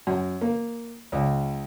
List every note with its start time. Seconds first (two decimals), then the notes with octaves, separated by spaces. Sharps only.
0.07 F#2
0.41 A#3
1.12 C#2